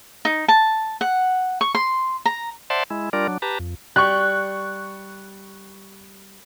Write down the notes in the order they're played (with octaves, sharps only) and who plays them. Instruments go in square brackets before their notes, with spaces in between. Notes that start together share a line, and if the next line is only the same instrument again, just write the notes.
[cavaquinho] D#4
A5
F#5
C#6
C6
A#5
[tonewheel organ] C5 D5 E5 F#5 A5 C6
G#3 E4
G3 D4 F4 A#4 D5
F#3 D4
G4 B4 A5 A#5
F2
[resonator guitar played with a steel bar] G3 [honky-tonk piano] C#6 F#6